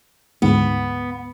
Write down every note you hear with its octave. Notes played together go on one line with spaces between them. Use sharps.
D2 G#2 B3